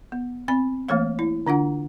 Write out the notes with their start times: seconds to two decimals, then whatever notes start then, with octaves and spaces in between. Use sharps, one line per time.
0.12 B3
0.48 C4 B5
0.88 E3 A3 A#3 C#5 F5
1.19 E4
1.47 D3 D4 F4 F#5